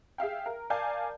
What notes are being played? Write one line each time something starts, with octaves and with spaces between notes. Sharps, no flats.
G#4 E5 F5 G5
A#4
A#4 D5 F5 G#5 A5 G6